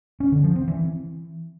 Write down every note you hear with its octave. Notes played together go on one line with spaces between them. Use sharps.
C#4
D3
F3
C4
E3